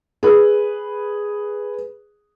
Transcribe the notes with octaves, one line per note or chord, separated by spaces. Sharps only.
G#4 B4